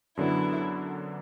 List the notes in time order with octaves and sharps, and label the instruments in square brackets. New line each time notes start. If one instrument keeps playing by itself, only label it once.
[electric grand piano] F#2 D3 F#3 B3 D4 [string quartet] E4